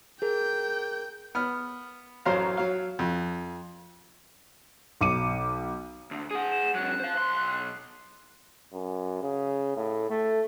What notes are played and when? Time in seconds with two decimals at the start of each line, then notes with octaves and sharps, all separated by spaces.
0.22 G#4 A#4 G5 G6
1.35 B3 F6
2.25 A1 F#2 F#3 C5 F5 A#5
2.57 F#3 F5
2.99 F2
5.01 B1 D6 C#7 D#7
6.11 D2
6.31 G#4 F#5 D#6
6.51 E7
6.75 G#2 F#3 F#6
7.00 C5 F5
7.18 B1 C6
8.73 F#2
9.22 C#3
9.77 A2
10.10 A3